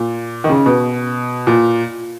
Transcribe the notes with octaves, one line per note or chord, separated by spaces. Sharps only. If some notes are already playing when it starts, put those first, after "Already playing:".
Already playing: A#2
D#3
C#3
B2
A#2